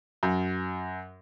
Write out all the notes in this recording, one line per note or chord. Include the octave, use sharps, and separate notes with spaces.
F#2